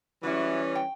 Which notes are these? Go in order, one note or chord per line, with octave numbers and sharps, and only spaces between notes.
E3 F#3 G3 C#4 E4
G5